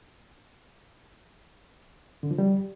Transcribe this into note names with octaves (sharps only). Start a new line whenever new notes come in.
D3
F3
G3